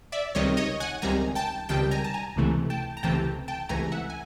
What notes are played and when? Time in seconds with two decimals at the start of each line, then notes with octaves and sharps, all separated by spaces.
0.12 D5 E5
0.35 C#2 C3 D#3 G3 C#5 D#5
0.57 C#5 D#5
0.80 F#5 G#5
1.02 C#2 C3 D#3 G3 G#5 A#5
1.35 G5 A5
1.69 C#2 C3 D#3 G3 G5 A5
1.91 G#5 A#5
2.04 A5
2.14 G#5 A#5
2.36 C#2 C3 E3 A3
2.70 G5 A5
2.97 A#5
3.03 C#2 C3 E3 A3 G5 A5
3.48 G5 A5
3.69 C#2 C3 E3 A3 G#5 A#5
3.92 E5 F#5
4.10 G#5